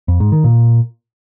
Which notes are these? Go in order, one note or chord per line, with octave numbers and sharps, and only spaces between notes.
F2
G#2
D#3
A#2